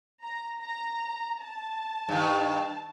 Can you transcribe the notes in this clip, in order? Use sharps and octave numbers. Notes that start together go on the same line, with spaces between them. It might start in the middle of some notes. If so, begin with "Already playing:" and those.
A#5
A#5
A5
G2 D#3